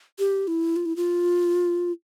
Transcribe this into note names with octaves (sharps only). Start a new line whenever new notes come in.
G4
E4
F4
E4
F4